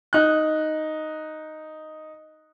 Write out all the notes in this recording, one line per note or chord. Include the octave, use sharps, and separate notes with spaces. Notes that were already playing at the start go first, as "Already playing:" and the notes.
D#4 F#6